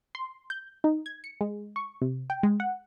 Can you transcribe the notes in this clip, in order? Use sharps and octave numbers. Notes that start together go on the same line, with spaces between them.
C6
G6
D#4
G#6
C#7
G#3
C#6
C3
G5
G#3
F#5